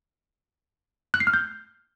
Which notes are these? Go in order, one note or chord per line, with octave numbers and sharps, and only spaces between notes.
F#6
C7
F6
G6